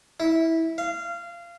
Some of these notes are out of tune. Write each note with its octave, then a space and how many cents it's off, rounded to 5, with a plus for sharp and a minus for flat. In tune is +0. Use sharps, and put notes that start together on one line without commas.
E4 -15
F5 -20